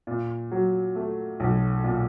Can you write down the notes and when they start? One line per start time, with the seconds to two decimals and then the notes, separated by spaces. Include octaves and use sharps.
0.07 A#2
0.51 F#3
0.95 A3
1.40 B1
1.84 A#2